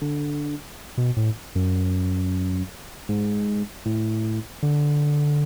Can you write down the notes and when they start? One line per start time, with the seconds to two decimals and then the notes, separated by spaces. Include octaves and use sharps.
0.02 D3
0.98 B2
1.17 A2
1.55 F#2
3.09 G#2
3.86 A2
4.63 D3